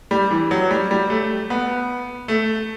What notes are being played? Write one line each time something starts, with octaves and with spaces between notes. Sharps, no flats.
G3
E3
F#3
G3
G3
A3
B3
A3